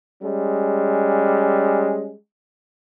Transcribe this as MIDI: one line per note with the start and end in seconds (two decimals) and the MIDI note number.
0.23 2.15 55
0.23 2.15 56
0.23 2.15 61